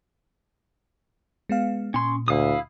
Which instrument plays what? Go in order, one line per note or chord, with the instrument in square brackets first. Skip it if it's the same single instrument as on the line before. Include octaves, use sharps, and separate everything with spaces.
[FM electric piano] G#3 B3 F5
[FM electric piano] A#2 [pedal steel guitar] C#4 C6
[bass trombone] D2 [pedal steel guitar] E4 F5 D#6